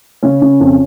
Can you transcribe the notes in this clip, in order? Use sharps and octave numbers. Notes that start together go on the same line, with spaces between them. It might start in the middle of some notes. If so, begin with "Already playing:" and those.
C#3 C#4
C#3
F2